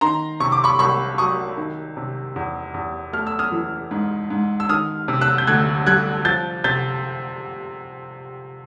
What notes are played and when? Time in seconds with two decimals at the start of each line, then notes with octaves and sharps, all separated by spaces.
0.01 D#3 A#5 C6
0.40 C3 C#6
0.52 D6
0.64 B5 C#6
0.79 C2 B5 C#6
1.18 F#3 C#6 D#6
1.57 D#3
1.97 C3
2.36 E2
2.74 E2
3.13 A3 F6
3.27 E6
3.39 D#6 F6
3.52 E3
3.91 G#2
4.30 G#2
4.60 E6
4.69 D#3 D#6 F6
5.08 C3
5.21 E6 F#6
5.38 G6
5.47 D2 F#6 G#6
5.86 G3 F#6 G#6
6.25 F3 G6 A6
6.64 C3 G6 A6